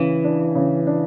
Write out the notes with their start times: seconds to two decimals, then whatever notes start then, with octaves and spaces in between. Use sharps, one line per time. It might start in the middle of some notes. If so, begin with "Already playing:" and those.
Already playing: C#3 E3
0.24 D4
0.55 C#3
0.87 D4